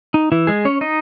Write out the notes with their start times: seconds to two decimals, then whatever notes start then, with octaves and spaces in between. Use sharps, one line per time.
0.14 D#4
0.32 E3 E4
0.47 G#3 G#4
0.65 C#4 C#5
0.81 D#4 D#5